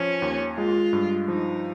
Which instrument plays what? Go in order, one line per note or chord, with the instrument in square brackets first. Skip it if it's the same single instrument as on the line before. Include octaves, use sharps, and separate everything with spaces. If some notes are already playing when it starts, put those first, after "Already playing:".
Already playing: [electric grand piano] F3 [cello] C#4
[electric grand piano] D#2
[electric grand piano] G#3 [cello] F4
[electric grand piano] G2
[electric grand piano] F3 [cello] D#4